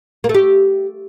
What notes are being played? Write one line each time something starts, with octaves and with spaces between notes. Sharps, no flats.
A#3
A3
G4